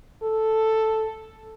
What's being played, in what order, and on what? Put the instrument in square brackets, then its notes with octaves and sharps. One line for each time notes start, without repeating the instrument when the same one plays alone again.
[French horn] A4